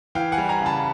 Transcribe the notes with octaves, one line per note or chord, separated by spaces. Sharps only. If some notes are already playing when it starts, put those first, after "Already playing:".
E3 F5 G5
F#5 G#5
G3
G#5 A#5
C#3
A5 B5